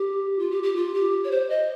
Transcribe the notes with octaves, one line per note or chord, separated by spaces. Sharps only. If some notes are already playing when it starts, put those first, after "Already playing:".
Already playing: G4
F4
G4
G4
F4
G4
C#5
C5
D#5